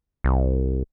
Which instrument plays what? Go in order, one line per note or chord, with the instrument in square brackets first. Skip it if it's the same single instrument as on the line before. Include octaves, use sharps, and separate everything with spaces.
[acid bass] C2